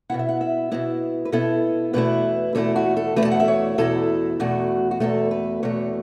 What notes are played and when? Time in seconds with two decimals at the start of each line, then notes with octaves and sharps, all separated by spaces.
0.10 B2 B3 E4 F#5
0.19 E5
0.29 F#5
0.41 E5
0.72 B2 B3 E4
1.25 B4
1.32 B2 B3 E4 A4
1.93 E2 B2 A3 E4 B4
2.55 E2 B2 A3 E4 A4
2.76 F#4
2.97 A4
3.16 E2 B2 A3 E4 B4
3.25 A5
3.32 F#5
3.40 E5
3.48 C#5
3.78 E2 B2 A3 E4 A4
4.40 E2 B2 A3 F#4
4.91 F#4
5.00 E2 B2 A3 A4
5.31 B4
5.63 E2 B2 A3 C#5